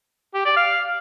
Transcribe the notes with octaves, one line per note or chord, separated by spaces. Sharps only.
G4
D5
F5